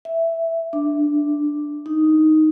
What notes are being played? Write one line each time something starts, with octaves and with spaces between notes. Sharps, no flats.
E5
D4
D#4